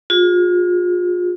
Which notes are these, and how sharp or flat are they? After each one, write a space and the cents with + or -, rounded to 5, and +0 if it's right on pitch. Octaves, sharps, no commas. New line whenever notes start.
F4 +35 G#4 -30